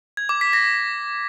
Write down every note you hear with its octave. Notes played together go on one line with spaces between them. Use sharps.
G#6
D6
B6
A#6